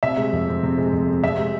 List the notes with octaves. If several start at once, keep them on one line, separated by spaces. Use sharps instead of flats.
C3 E5
G#3
F2
C4
C3
G#3
F2
C4
C3 E5
G#3